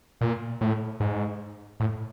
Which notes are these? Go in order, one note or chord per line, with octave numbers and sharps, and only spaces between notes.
A#2
A2
G#2
A2